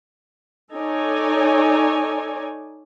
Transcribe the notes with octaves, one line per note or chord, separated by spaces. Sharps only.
D#4 A4 C#5 D5 G#5